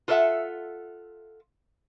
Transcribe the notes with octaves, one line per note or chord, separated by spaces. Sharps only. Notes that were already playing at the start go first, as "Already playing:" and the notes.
F4 A4 A#4 D5 E5 F#5